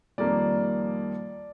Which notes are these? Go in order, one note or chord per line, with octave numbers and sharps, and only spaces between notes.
F2 D#3 G3 A#3 D5